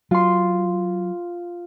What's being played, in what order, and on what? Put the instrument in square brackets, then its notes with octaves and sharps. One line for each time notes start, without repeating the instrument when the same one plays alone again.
[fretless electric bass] F#3 [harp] F4 C6